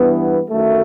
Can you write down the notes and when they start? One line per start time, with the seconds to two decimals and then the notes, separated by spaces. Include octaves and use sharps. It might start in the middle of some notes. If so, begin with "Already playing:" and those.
Already playing: G2 E3 B3
0.50 F#2 D#3 F#3 A3